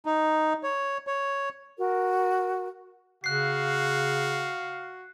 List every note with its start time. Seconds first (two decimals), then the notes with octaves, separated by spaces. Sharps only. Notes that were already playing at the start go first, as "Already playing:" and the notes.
0.06 D#4
0.63 C#5
1.07 C#5
1.78 F#4 A#4
3.24 C#3 F#4 F5 F#6 C7